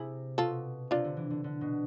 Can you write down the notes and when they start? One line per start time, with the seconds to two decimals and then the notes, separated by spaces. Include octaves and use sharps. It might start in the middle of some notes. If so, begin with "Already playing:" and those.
Already playing: C3 E4 G#4
0.38 B2 F4 A4
0.91 C3 D4 F4
1.04 D3
1.17 E3
1.30 D3
1.44 D3
1.61 B2